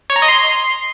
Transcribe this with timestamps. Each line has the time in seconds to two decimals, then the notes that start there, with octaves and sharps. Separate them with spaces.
0.10 C#5
0.16 A#5
0.22 D#5
0.28 C6